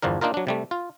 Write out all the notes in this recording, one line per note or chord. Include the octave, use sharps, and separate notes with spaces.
G1 E2 F3 D4 A#4
A#3 D4 D#4 F4 A#4
F#3 D4
C3 G3 A3
F4